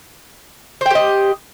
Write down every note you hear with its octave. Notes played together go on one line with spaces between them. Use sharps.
G4 C5 D#5 G5